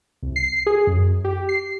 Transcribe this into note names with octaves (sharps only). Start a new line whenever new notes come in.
C2
C7
G#4
F#2
G4
C7